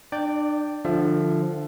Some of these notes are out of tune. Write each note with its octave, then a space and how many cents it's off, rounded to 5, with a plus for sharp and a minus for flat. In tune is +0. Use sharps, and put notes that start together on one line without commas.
D4 +35 D5 +0 G5 +0
D3 +20 F3 +0 E5 +25